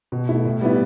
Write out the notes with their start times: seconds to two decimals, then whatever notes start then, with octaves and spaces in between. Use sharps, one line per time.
0.12 B2
0.29 A3 E4
0.45 A2
0.61 G3 B3 E4